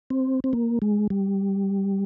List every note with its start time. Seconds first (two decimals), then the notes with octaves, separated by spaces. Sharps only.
0.10 C4
0.44 C4
0.53 A#3
0.82 G#3
1.10 G3